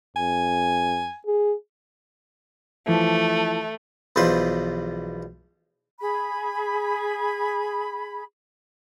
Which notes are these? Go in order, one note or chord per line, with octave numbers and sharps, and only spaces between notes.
F2 G#5
G#4
E3 F3 A3
B1 E2 F3 B4 C6
G#4 B5